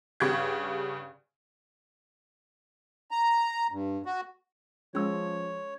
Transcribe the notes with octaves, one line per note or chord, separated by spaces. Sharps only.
G2 C#3 G4 F#5 C#6 G#6
A#5
G2
F#4
F3 G#3 C#4 C#5 E6